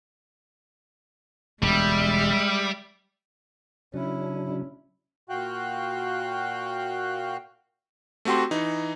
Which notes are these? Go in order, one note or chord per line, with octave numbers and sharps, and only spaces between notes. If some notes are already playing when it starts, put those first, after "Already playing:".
E1 D2 G3 G#3 E5
C#3 F#3 C#4 D4 E4
A#2 F#4 F5 G5 F#6
A3 C4 F#4 G4 C6
E3 D#4